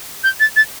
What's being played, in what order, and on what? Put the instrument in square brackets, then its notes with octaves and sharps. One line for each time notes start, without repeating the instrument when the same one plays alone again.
[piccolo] G6
A6
A6